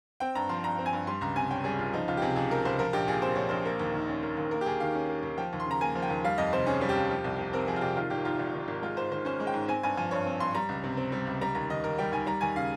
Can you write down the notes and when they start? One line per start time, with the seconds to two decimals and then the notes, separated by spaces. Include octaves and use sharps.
0.20 C4 G5
0.35 G2 A#5
0.49 F3 C6
0.64 G2 A#5
0.79 C4
0.86 G#5
0.93 G2
1.07 G3 C6
1.21 C#2 A#5
1.36 C3 G#5
1.50 C#4 G5
1.64 G3 G#4
1.79 C#2 F4
1.93 F3 D#4
2.08 C#2 F4
2.17 G4
2.22 C3 G#4
2.36 C#2 G#4
2.50 F3 A#4
2.65 C#2 C5
2.79 F3 A#4
2.93 A#1 G4
3.08 A#2 G#4
3.22 C4 C5
3.35 F3 C#5
3.49 A#1 C5
3.65 A#3
3.79 D#2
3.94 D#3
4.09 C#4
4.23 A#3
4.37 D#2
4.51 A#3 A#4
4.61 G4
4.66 D#2 G#4
4.80 D#3 F5
4.95 C#4
5.09 A#3
5.23 D#2
5.37 F3 G5
5.53 D#2
5.60 C6
5.66 C#3 A#5
5.81 A#3 G#5
5.95 F3
6.02 G5
6.10 D#2
6.24 G3 F5
6.38 F2 D#5
6.53 C3 C5
6.66 C#4 G#4
6.81 G3
6.89 G4
6.95 F2
7.11 F3
7.24 C2
7.38 C3
7.53 C4 A#4
7.68 F3 G#4
7.76 F4
7.81 C2 G4
7.96 D#3 F4
8.10 G#1 G4
8.25 G#2 F4
8.39 G#1
8.53 D#3
8.68 G#1
8.82 G#3 F4
8.97 G#2 C5
9.11 D#3 C5
9.25 C#4 C5
9.40 G#3
9.47 G5
9.54 G#2
9.68 C4 G#5
9.83 G2 G#5
9.97 F3 G#5
10.11 G2 C#5
10.26 C4
10.40 G2 C6
10.55 G3 A#5
10.69 C#2
10.83 C3
10.97 C4
11.12 G3
11.27 C#2
11.41 G3 A#5
11.55 D#2 A#5
11.70 D#3 D#5
11.84 D#2 A#4
11.98 G3 G5
12.12 D#2 G#5
12.26 G3 A#5
12.41 D#2 G#5
12.56 C#3 F5